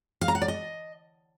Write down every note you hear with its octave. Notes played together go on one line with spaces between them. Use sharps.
F5
A#5
F#5
D5
D#5